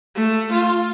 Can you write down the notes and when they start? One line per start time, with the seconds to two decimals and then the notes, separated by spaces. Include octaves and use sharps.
0.16 A3
0.52 F4